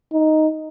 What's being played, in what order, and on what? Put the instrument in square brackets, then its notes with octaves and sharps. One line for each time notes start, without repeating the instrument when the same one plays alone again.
[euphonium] D#4